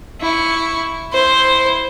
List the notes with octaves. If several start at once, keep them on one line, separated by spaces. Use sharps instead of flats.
E4 C#6
E4 C5